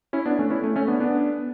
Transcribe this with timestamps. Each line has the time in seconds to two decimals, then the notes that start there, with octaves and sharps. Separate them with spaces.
0.13 C#4 E4
0.26 B3 D4
0.39 A3 C#4
0.50 C#4 E4
0.63 A3 C#4
0.76 A3 C#4
0.88 B3 D4
1.00 B3 D4